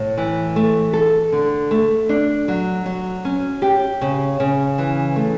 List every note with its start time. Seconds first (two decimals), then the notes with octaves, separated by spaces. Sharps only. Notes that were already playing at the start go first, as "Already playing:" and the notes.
Already playing: A2
0.17 E3
0.56 A3
0.93 A4
1.32 D3
1.71 A3
2.09 D4
2.48 F#3
2.86 F#3
3.25 C#4
3.62 G4
4.01 C#3
4.40 C#3
4.78 E3
5.16 A3